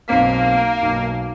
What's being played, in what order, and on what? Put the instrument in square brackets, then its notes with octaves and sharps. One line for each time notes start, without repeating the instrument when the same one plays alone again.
[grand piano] B1 C4 B6 [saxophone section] A#3
[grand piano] B1